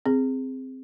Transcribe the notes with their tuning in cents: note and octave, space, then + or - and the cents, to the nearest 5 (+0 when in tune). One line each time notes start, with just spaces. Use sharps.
C4 -5 G#4 +0